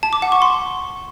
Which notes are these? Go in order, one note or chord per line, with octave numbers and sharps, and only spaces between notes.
A5
D6
F#5
C#6
C6